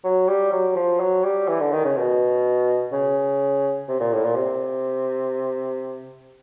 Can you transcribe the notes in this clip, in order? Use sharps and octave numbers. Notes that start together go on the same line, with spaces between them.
F#3
G3
F#3
F3
F#3
G3
E3
D3
D#3
C#3
B2
C#3
C3
A#2
A2
A#2
C3